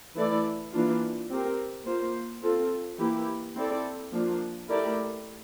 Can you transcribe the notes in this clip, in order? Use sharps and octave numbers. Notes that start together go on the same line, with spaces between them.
E3 A3 E4 A4 D5
E3 A#3 D4 F4
C4 G4 A#4
A#3 F4 C5
C4 F4 A4
E3 A#3 E4 G4
C4 E4 A4 D5
F3 A#3 D4 F4
A3 E4 G4 A#4 D5